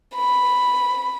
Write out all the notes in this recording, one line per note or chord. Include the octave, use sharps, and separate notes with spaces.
B5